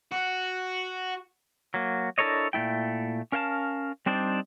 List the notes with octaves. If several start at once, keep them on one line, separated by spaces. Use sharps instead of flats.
F#4
F#3 A#3
D4 E4 A4 A#4 C#5 D#5
A#2 G#3 A3 E4 G5
C#4 A#4 F5 G5 A5
G3 C4 D4 D#4 C5 D5